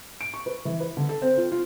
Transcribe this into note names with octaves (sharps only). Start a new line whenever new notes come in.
D7
C#6
B4
E3
B4
D3
A4
C4
F4
F4